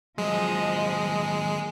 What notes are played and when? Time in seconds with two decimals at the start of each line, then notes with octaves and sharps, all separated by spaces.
0.18 D#2 F3 F#3 G#3 D#5